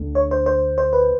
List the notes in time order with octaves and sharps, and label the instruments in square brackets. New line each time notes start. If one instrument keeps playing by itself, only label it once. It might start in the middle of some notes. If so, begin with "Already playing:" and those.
Already playing: [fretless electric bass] D2 D3
[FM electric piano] C#5
C5
C5
C5
B4